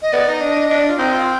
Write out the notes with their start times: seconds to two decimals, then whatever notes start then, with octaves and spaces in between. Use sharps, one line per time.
0.02 D#5
0.12 B3 D5
0.28 D#4 D#5
0.41 D4
0.56 D4
0.70 D4 D#5
0.79 D5
0.88 F4
0.98 C4 D#4
1.12 F4